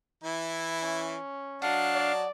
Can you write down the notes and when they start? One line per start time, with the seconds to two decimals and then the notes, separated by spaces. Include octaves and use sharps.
0.23 E3 E4
0.83 C#4
1.62 F#3 D4 F#4 D#5 F5 A5
1.95 D5